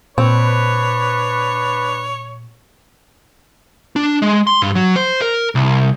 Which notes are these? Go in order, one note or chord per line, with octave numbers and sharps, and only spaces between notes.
A#2 C4 D4 B4 C#5
D4
G#3
C6
G2
F#3
C5
A#4
C2